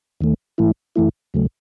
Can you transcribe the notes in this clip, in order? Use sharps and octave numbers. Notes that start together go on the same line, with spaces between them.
D#2 D#3 A3
G#2 E3 A3 E4
F#2 E3 A3 E4
D#2 C#3 F#3 A3